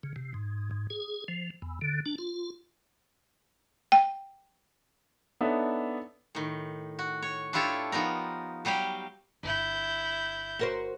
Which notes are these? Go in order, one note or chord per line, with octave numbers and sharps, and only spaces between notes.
C#3
C3
G#2
G#2
G#4
F3
E2
D3
D4
F4
G5
B3 D4 D#4 A4 C#5 E5
A2 D#3
F#4
C#5
D4 E4 F4 G4 A4 C#5
F3 B3 D#4 A#4
F#3 G3 G4 F5 G5
G1 E4 G6
F#4 A#4 C5